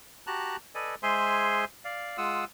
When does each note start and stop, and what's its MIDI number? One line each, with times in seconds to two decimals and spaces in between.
0.27 0.57 66
0.27 0.57 67
0.27 0.57 81
0.27 0.57 82
0.27 0.57 90
0.75 0.95 69
0.75 0.95 71
0.75 0.95 74
0.75 0.95 75
0.75 0.95 80
1.03 1.65 56
1.03 1.65 68
1.03 1.65 72
1.03 1.65 76
1.03 1.65 80
1.03 1.65 84
1.85 2.17 74
1.85 2.17 77
2.18 2.45 56
2.18 2.45 65
2.18 2.45 78
2.18 2.45 87
2.18 2.45 88